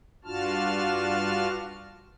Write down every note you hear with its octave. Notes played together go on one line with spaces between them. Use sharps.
G2 D4 F4 F#4 A5 F6